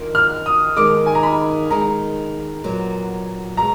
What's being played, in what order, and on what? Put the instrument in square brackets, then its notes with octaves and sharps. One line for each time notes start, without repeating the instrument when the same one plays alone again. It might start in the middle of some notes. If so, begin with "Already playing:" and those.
Already playing: [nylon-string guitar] D#3 A#3 D4 F4
[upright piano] F6
D#6
[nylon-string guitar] D#2 D#3 G#3 D#4 A#4 [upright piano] D6
[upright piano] G#5
A#5
B5
[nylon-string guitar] D#3 G#3 D#4 [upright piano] A#5
[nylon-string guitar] A#2 F#3 B3
[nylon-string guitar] B2 G#3 [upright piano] A#5